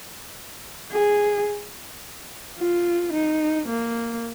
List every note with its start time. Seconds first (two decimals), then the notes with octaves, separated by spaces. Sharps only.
0.92 G#4
2.58 F4
3.13 D#4
3.67 A#3